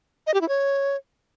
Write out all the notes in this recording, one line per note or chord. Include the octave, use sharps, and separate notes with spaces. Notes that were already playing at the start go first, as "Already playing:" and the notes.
D#5
G4
E4
C#5